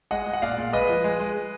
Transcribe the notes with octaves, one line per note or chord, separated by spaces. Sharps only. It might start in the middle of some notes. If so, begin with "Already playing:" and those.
G#3 D#5 F#5
G#3
F#5
A#2 D5 F5
A#2
G#3 B4 D#5
F3
G#3
G#3